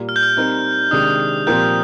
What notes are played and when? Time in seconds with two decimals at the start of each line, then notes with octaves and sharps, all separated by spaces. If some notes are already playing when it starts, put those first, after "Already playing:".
Already playing: A#2 G3 A#3
0.09 F6
0.16 G6
0.23 F6
0.37 G3 C4 D#4 A#4
0.91 C3 D#3 G#3 D4 D#6
1.47 A#2 F3 C4 G4 A#4 G6